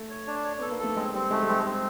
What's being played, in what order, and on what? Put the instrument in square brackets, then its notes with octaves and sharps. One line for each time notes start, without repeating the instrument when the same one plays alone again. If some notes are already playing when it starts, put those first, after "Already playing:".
Already playing: [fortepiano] A3
[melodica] C#5
D4
C#5
[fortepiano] B3 [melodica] A4
[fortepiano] A#3
[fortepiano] A3 [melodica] A4
[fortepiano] G#3 [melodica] C4
[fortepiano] G3 [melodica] C4
[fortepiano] G#3 [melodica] A3
[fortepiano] G3
[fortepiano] G#3 [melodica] C4
[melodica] C4